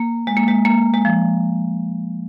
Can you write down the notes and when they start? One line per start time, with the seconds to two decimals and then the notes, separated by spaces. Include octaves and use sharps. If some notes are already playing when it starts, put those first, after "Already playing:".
Already playing: A#3
0.27 G#3
0.37 A#3
0.48 G#3
0.65 A#3
0.94 G#3
1.05 F3